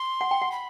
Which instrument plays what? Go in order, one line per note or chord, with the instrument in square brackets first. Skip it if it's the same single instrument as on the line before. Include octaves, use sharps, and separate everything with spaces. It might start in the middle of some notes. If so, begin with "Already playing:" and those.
Already playing: [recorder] C6
[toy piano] F#5
G5
F#5
[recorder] B5